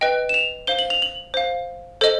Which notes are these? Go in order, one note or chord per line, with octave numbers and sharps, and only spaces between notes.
B4 D#5 G5
E7
F7
C5 F5 G7
F#7
F7
F#7
C5 F5
A4 C5 D#5